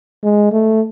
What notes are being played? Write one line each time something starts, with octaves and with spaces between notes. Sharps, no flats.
G#3
A3